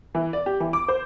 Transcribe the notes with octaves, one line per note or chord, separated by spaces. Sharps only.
E3
D5
G4
E3
D6
C5